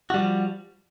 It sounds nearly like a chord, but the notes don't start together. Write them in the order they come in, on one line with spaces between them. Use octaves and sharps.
F#4 G3 F3